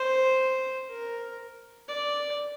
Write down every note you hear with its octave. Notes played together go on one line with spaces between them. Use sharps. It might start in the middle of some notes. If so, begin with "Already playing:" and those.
Already playing: C5
A#4
D5